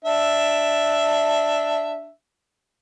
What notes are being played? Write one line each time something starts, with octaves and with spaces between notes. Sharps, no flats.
D4 E5